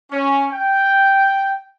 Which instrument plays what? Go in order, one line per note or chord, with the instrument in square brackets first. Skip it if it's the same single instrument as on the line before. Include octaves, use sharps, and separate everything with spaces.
[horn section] C#4
G5